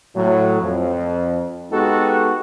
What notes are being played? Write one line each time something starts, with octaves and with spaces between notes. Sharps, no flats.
A2 F#3
F2
G#3 B3 D#4 F#4 G4 A4